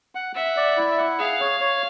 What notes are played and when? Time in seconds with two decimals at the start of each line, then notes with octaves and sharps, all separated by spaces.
0.15 F#5
0.35 E5 F#5
0.57 D5
0.77 E4
0.97 F#5
1.19 G#4 F5
1.40 C#5
1.60 C#5